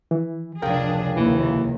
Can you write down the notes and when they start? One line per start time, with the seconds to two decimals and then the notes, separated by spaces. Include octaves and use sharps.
0.11 E3
0.62 F1 C#2 D4 G#4 A#4 F5 G5
1.17 D#2 E3